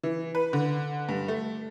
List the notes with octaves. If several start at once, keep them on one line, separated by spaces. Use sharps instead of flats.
E3
B4
D3
G2
A3